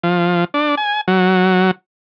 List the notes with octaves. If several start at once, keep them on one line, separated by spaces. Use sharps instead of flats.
F3
D4
G#5
F#3